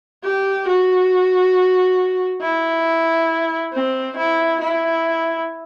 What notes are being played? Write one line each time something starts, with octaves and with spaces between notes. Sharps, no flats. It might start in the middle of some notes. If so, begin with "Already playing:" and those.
G4
F#4
E4
C4
E4
E4